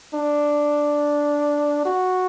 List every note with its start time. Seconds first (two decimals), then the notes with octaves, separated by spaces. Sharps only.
0.14 D4
1.85 F#4